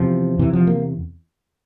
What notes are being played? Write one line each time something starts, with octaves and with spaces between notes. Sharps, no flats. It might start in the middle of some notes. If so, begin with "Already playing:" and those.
Already playing: E2 C3 F3
E2 C3 E3
F3
A#3